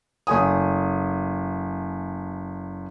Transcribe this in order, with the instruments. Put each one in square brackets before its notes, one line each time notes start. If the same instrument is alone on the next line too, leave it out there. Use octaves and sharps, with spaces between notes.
[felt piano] F#1 A3 G#5 D#6